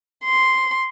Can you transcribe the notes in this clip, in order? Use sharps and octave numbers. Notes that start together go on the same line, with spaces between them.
C6